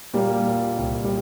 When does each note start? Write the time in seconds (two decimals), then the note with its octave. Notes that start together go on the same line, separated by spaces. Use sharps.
0.14 A#2 G3 A#3
0.46 A#2
0.77 C2
1.04 G3